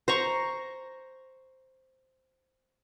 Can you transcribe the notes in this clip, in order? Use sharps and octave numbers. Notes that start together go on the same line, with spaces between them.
C5 A#5 C#6